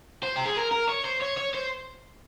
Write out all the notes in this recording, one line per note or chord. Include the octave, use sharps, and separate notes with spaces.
C5
G4
G#4
A#4
A#4
C#5
C5
C#5
C#5
C5